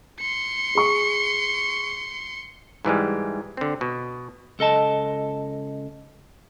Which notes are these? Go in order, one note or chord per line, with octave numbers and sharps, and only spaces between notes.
C6 C#7
G#4 C#6
G#2 E3 G3 G#3
D3 C4
B2
C#2 A4 D#5 A5